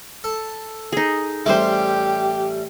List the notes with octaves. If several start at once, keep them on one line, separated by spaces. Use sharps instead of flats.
A4
D#4 G#4
A1 G3 E4 G4 C5 D6